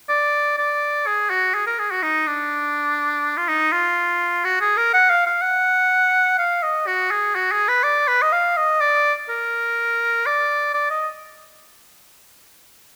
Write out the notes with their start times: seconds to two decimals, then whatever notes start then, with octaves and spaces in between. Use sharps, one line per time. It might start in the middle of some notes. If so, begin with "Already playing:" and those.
0.09 D5
0.58 D5
1.07 G#4
1.30 F#4
1.54 G#4
1.67 A#4
1.79 G#4
1.91 F#4
2.03 D#4
2.27 D4
3.37 F4
3.48 D#4
3.72 F4
4.45 F#4
4.61 G#4
4.77 A#4
4.94 F#5
5.10 F5
5.26 F5
5.42 F#5
6.38 F5
6.62 D#5
6.87 F#4
7.11 G#4
7.35 F#4
7.52 G#4
7.68 B4
7.83 D5
8.08 B4
8.22 D#5
8.32 F5
8.56 D#5
8.80 D5
9.29 A#4
10.26 D5
10.74 D5
10.90 D#5